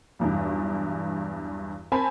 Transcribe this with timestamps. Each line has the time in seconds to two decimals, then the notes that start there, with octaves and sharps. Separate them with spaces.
0.19 B1 E2 G2
1.92 C4 A#4 G#5 A5 B5